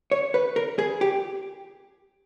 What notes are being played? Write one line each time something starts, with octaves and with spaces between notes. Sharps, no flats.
C#5
B4
A#4
G#4
G4